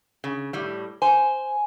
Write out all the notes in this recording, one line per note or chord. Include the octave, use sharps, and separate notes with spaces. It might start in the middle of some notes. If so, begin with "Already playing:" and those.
C#3
A2 G3
C5 G#5